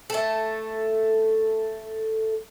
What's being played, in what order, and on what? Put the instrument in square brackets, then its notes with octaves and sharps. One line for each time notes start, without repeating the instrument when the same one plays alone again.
[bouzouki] A3 A4